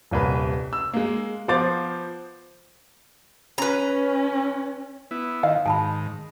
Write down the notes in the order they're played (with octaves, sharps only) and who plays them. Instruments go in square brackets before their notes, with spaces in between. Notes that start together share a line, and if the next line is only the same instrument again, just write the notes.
[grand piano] D#1 C2 B4
E6
G#3 A#3
F3 B3 C5 F5 D6 A6
[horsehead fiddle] C#4 [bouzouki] B4 A#5
[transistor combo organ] B3 E4
[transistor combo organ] D#3 [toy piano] D#5 [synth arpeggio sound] F5
[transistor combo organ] G#2 D#3 [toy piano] G#5 A5 B5